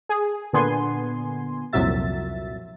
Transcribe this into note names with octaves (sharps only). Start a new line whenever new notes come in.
G#4
A#2 D3 B3 G#5 C6
C2 F2 A#2 F#3 E5 A6